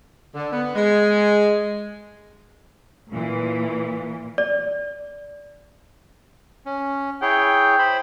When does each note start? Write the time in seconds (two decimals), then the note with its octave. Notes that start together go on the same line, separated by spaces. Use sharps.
0.35 D3
0.52 B3
0.75 G#3
3.10 A#2 E3
4.38 D5
6.66 C#4
7.22 E4 G#4 C#5 G5
7.79 C5 B5